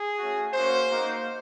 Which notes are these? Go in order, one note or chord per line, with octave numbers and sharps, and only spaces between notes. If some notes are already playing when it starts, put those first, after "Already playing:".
Already playing: G#4
A3 C#4 F#4
A#3 C#4 F#4 C5
A#3 D#4 F#4